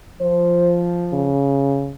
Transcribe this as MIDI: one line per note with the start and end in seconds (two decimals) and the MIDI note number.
0.20 1.31 53
0.20 0.77 72
1.13 1.95 49